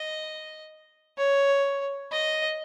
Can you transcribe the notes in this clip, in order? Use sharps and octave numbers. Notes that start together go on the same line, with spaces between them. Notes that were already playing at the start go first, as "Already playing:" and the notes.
Already playing: D#5
C#5
D#5